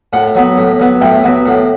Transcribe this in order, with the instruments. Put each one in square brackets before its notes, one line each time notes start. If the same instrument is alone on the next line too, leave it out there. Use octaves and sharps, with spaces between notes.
[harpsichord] A2 [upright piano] F#5
[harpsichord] F#3 B3
A2
F#3 B3
[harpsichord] A2 [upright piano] E5 G5
[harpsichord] F#3 B3 F#4
[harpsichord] A2 [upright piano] F#5